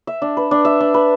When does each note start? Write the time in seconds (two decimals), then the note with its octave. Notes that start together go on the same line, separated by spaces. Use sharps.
0.07 E5
0.22 D4
0.37 B4
0.51 D4
0.65 E5
0.80 D4
0.94 B4